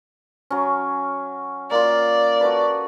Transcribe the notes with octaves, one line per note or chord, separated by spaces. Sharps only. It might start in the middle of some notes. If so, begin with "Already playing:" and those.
F#3 C#4
A#3 F4 D5
F#4 A4 B4